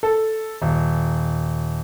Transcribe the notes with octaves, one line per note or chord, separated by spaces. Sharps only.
A4
D#1